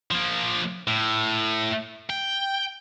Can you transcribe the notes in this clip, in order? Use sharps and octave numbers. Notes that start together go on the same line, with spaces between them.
F3 A#3
A2
G5